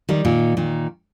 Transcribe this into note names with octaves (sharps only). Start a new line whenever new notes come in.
D#3 G3
A#2 D#3
A#2 D#3